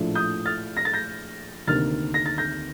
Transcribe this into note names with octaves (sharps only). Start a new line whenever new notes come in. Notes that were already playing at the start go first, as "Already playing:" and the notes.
Already playing: A#1 A2 F3 A3
D#6 G6
F6 A6
A#6
A6
G6 A#6
D2 C3 D#3 A#3 F6 A6
A#6
A6
G6 A#6